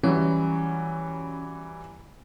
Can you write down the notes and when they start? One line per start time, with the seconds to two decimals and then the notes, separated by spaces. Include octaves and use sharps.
0.03 E3 F#3 G3 C#4